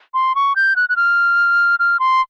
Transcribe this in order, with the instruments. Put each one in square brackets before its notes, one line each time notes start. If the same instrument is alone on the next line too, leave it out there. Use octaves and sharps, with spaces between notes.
[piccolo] C6
C#6
G6
F#6
F#6
F6
F6
C6